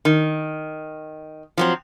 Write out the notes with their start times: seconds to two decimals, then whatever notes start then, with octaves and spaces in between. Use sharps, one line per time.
0.05 D#3
1.58 F3 F#3 C4